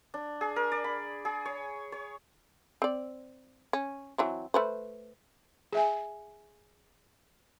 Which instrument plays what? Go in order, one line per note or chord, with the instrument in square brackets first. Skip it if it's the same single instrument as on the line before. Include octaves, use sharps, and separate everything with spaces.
[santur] D4
G#4
A#4
D5
B5
G#4
C#5
C#5
[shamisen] C4 D5
C#4
E3 F#3 C4
A3 B4 C5
[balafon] G#4 E5 G#5